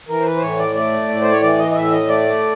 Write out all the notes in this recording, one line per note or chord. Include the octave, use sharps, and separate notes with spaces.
E3 A#4
C5
B4
C5
A2 C#5
D5
A3 D5
A2
C5
C#5
E3 D5
D#5
D#5
A2 E5
D#5
A3 D5